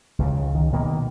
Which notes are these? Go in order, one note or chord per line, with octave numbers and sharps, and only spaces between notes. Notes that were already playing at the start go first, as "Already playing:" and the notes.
C#2 C#3
D#3
B2 D#3 A#3